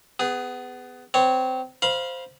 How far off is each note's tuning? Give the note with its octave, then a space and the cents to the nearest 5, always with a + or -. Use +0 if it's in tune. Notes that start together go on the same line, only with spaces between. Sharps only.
B3 +20 G#4 -15
C4 -20 C#5 -5
C5 +0 F5 +0 B5 -30